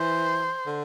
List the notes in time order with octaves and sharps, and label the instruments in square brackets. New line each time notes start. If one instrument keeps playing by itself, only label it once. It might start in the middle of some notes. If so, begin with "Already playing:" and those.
Already playing: [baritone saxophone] E3 [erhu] C5
[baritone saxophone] D3